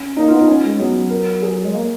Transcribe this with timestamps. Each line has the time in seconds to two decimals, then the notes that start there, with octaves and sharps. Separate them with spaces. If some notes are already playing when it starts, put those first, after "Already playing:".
Already playing: C#4
0.16 A#3 D#4
0.28 B3 F4
0.38 D#4
0.48 C#4
0.64 G#3
0.79 F#3 B3
1.10 A#4
1.42 G#4
1.65 G#3
1.75 A#3